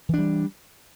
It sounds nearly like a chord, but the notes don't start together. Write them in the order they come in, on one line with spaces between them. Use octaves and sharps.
E3 D4 G3